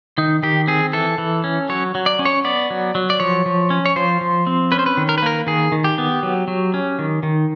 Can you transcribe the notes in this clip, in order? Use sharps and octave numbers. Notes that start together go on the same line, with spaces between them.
D#3 D#4
D#3 G4
C4 G#4
E3 A4
E3
C#4
F#3 C#5
F#3
D5
C#4
C#5
B3 D5
F#3
F#3
D5
F3 C#5
F3
C#4
C#5
F3 C5
F3
C4
C#4 B4
C5
B4
D#3
A#4
B4
A#3 A#4
D#3 G#4
D#3
G4
B3
F#3
F#3
C#4
D#3
D#3